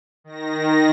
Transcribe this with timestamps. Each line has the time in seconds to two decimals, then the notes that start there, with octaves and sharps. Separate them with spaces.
0.24 D#3 A#6